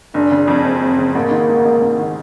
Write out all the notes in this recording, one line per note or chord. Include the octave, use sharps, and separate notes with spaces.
F#1 D4
C#3
F2
F#1 C4
F#1
C#3
A1 A#3
D#3
G#2
A1
A1
D#3